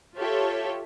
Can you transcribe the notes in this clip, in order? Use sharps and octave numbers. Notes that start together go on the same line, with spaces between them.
F4 G4 A4 C#5 E5